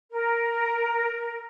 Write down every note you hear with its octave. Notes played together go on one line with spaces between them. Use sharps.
A#4